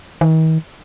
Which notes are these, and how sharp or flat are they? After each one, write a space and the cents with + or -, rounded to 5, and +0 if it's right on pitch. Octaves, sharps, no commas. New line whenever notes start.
D#3 +45